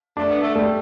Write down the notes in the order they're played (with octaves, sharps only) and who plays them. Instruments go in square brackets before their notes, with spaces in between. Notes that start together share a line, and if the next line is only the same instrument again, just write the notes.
[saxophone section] A3 [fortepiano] D4
[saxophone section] B3
A3
[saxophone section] G3 [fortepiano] A3